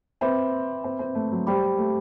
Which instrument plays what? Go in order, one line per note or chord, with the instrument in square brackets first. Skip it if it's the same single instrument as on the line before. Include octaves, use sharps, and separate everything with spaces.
[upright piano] C4 [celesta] B4 E5 B5 D6
[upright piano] C4
C4
A3
F#3
[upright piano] G3 [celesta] G4 C5 G5 B5 D6
[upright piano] A3